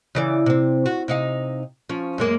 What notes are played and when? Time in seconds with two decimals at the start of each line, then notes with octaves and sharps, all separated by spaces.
0.15 C#3 E3 D5
0.46 C3 C4
0.86 F#4
1.08 C3 D#4 F5
1.89 F3 C#4
2.18 F#2 G#3 A#3